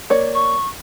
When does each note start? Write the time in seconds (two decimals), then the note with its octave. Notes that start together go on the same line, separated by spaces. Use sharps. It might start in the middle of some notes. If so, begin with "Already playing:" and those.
0.10 A#3 C#5 D5
0.35 C#6